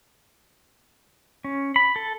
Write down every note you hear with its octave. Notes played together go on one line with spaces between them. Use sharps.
C#4
B5
A4